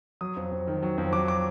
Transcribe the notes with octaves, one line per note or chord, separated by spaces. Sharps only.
F#3 D#6
F2
F2
D#3
F#3
F2
F#3 D6
D6